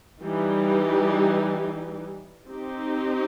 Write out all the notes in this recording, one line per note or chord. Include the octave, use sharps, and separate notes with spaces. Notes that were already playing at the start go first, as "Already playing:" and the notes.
E3 G3 D#4 G4
C4 D#4 G4